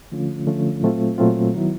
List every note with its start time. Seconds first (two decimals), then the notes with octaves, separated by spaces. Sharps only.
0.12 D3 F3 A3 C#4 F4
0.47 D3 F3 A3 C#4 F4
0.82 A#2 F#3 A3 C4 F4
1.18 A#2 F#3 A3 C4 F4
1.55 D#3 F#3 B3 E4